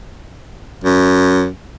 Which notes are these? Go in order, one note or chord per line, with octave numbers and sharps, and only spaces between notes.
F#2